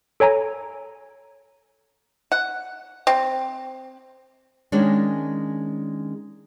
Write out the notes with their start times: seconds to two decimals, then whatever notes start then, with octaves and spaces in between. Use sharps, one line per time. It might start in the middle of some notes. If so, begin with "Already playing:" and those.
0.20 A4 C#5 G#5 A#5
2.32 F#5
3.07 C4
4.72 D#3 G#3 A#3 C#4 D4